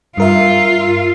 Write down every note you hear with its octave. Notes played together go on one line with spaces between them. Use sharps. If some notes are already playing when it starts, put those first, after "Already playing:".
G2 F4 A#4 E5